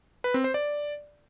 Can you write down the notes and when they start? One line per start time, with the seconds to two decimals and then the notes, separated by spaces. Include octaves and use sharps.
0.24 B4
0.34 C4
0.44 C5
0.54 D5